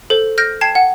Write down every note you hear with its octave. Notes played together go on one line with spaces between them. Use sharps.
A4 C5
F6 G6 A#6 D7
G5 A5 G#6 C7 E7
F#5